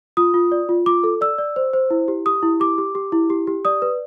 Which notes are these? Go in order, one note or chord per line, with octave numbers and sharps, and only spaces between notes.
F4 D#6
F4
D5
F4
F4 D6
A4
D5 E6
D5
C5
C5
E4
G4
G4 D#6
E4
G4 D6
G4
G4
E4
G4
G4
D5 D#6
B4